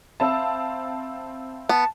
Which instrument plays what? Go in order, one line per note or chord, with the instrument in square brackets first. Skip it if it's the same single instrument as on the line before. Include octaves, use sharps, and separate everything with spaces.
[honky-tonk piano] C4 F5 A5 [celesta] E5 B5 E6
[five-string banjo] B3 [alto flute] A5